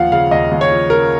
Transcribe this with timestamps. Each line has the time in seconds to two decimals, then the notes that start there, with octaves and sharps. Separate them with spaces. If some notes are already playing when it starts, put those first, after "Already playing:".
Already playing: D#2 F3 F5 F#5
0.12 C#3 F5
0.31 D#2 D#5
0.51 D#2
0.61 C#5
0.71 F3
0.90 C#3 A#4